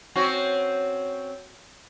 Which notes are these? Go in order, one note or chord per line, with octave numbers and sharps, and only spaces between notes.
C4 C#4 F#4